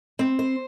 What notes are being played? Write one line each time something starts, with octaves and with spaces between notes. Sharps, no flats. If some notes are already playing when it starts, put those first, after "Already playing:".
C4
C5